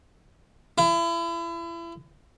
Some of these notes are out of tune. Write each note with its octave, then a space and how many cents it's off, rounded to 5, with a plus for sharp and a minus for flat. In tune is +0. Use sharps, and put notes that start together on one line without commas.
E4 +35